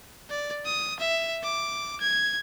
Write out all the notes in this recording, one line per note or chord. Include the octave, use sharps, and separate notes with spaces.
D5
D#6
E5
D6
G#6